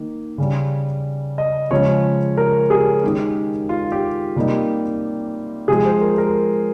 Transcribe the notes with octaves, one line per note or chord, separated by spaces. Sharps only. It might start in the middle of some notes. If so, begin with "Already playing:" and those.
Already playing: D#3 A#3
C#3 G3 C#4
D#5
C#3 F3 G#3 C#4 C#5
A#4
G#4
D#3 G#3 C#4 G4
F4
G4
C3 G3 A#3 D#4
C3 F3 G#3 G#4
C5
A#4
A#4